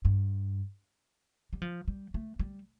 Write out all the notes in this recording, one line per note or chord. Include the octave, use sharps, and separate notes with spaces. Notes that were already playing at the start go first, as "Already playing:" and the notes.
G2
G3
F3
G3
A3
G3